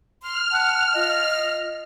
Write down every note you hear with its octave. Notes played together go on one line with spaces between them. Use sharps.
C6 F6
F#5 A5 F#6
F4 D#5